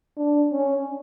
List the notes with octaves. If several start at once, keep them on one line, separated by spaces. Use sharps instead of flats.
D4
C#4